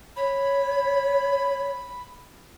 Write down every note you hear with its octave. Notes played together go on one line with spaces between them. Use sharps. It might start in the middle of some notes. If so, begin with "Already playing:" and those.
C#5 B5